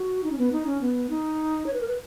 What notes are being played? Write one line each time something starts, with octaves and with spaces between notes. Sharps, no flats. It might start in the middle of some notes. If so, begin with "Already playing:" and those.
Already playing: F#4
D#4
C#4
B3
D#4
C#4
B3
D#4
C#5
B4
A#4
B4